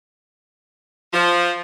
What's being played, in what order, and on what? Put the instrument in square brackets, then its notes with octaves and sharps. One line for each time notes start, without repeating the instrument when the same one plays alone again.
[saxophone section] F3